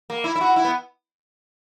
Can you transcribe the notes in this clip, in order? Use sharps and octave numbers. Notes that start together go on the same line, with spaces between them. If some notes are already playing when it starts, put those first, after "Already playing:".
A#3
E4
E4
F#4
E4
B3